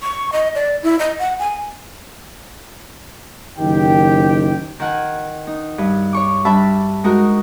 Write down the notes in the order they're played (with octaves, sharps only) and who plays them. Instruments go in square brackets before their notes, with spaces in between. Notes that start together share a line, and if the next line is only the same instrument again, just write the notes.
[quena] C#6
D#5
D5
E4
D#5
F#5
G#5
[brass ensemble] F#1 D#3 G4 G5
[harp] D#3 F#5 G#5
D#4
G2
C#5 C#6 D6
G3 D4 E5 A5 B5
G#3 D#4 F#4 A#4